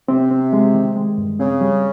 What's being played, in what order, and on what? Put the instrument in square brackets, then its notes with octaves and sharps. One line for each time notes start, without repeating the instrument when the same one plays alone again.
[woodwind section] C3 [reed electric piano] C4
[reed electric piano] C4
G#3
D#3
G#3
G2
[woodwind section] C#3 [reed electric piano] C4
[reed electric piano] G3